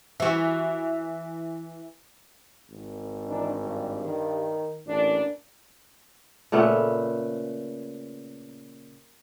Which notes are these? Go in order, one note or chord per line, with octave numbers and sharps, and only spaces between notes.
E3 F#4
G#1
E3 D4 D#4
G2
D#3
A1 A#2 D4 D5
A#2 C#3 A3 B3